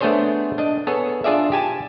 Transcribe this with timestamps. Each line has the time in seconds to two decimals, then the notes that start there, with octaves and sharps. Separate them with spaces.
0.01 A3 B3 D4 G#4 C5 C#5
0.58 D4 D#5
0.87 B3 G#4 A4 C#5
1.24 D4 F4 G#4 D5 E5
1.52 G4 G#5 A5